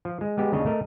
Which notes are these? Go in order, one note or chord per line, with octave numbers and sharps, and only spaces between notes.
F3
G#3
G#3 B3 G4
D#2 C#3 D4 C#5 D#5
A3 A#4 D#5